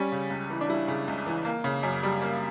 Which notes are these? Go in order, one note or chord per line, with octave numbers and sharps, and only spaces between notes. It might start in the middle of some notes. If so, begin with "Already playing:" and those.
Already playing: G3 C#4
C#3
C#2
E3
D4
G3 E4
C#3
C#2
E3
A#3
C#3
F#2
G3
A#3